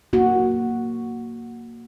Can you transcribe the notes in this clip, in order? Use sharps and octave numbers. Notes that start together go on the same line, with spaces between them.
A#3 F#4